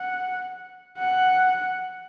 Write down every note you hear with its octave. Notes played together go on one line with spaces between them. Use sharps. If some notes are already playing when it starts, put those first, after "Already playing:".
Already playing: F#5
F#5